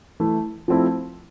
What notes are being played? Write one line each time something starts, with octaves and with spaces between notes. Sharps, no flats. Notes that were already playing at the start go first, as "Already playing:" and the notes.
E3 A3 E4
F3 A3 C4 E4